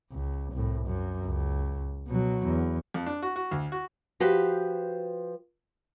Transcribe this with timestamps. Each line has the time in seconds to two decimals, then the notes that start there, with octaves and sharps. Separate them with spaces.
0.12 C#2
0.53 C2 A2
0.86 F#2
1.25 C#2
2.08 B2 F#3
2.46 E2
2.94 F2
3.07 D4
3.22 F#4
3.36 F#4
3.51 D2
3.72 F#4
4.20 F3 F#4 G4 B4 C5